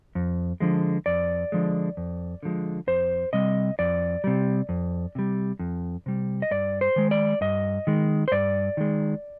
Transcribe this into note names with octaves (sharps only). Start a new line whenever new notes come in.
F2
D3 F3 G#3
F2 D5
D3 F3 G#3
F2
D3 F3 G#3
F2 C5
C3 G3 D#5
F2 D5
C3 G3
F2
C3 G3
F2
C3 G3
D#5
G2 D5
C5
D#3 G#3
D5
G2 D#5
D#3 G#3
C5
G2 D5
D#3 G#3